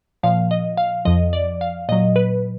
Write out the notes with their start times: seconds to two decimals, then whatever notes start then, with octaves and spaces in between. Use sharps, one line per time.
0.23 A#2 F3 F5
0.51 D#5
0.77 F5
1.05 F2 F3 D#5
1.33 D5
1.61 F5
1.89 A#2 F#3 D#5
2.16 B4